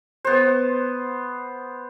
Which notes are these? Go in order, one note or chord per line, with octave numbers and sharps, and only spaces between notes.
B3 C5